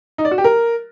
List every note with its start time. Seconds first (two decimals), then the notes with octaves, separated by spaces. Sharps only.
0.18 D#4
0.25 D5
0.31 F#4
0.38 G4
0.44 A#4